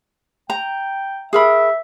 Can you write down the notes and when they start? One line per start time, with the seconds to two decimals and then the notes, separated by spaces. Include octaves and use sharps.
0.50 G5 A#5
1.33 G#4 A#4 E5 B5